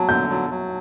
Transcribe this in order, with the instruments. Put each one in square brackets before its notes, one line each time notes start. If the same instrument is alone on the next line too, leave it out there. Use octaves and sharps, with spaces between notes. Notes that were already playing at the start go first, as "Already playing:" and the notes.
Already playing: [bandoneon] F#3 [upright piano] A5
[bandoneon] D3 [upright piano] G6
[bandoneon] F#3
F#3